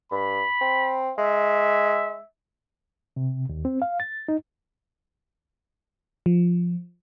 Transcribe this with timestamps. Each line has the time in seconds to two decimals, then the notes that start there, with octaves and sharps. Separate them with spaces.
0.11 G2 B5
0.61 C4
1.18 G#3 E5
3.16 C3
3.49 D#2
3.65 C4
3.82 F5
4.00 A6
4.28 D#4
6.26 F3